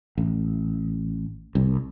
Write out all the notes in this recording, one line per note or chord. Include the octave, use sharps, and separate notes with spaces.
A1
C2